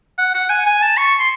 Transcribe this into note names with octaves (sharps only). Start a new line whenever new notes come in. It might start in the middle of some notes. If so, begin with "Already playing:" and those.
F#5
F#5
G#5
G#5
A5
C#6
C6